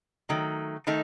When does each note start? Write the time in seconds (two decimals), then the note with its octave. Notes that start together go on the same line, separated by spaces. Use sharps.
0.29 D#3 F#3 A3
0.87 D#3 A3 D#4